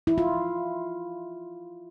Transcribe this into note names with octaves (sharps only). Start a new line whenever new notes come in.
E4
F4